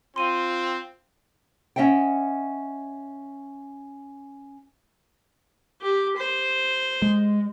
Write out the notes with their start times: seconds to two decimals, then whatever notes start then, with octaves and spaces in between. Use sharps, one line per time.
0.16 C4 F4 C6 D#7
1.76 C#4 D#5 E5 F#5 G5
5.81 G4
6.16 C5
7.02 G#3